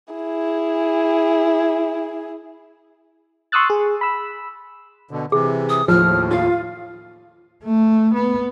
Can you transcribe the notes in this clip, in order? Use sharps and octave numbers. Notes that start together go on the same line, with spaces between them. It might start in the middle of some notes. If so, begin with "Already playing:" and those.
E4 G#4
C6 C#6 D#6 E6 F#6 A6
G#4
B5 E6
B2 D3
C3 E3 G#4
D#6
D#2 A2 F3 F6
F4 F5
A3
B3